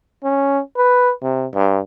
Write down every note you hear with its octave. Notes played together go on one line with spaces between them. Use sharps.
C#4
B4
C3
G2